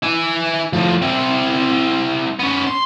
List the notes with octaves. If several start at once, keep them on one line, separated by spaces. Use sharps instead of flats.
E4 G#5
A2 F3
C4 E4
B3 C#4
C6